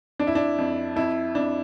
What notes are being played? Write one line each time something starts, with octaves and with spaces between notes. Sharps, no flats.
F2 D4
E4
D4
F2
F2 E4
F2 D4